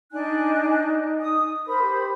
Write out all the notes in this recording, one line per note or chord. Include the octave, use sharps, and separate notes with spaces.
D4 D#4 G#5 F#6
D#6
A#4 C5 B5
G4